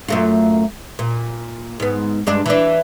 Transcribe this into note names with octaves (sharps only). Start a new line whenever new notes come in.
F#2 A3 F4
A#2
G#2 B3
G2 G#3 D4
E3 D4